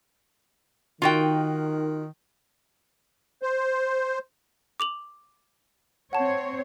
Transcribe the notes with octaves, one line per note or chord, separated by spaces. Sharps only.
D#3 F4 F#4 G5
C5
D6 F7 F#7
C4 C5 C#5 F#5 A5 C#6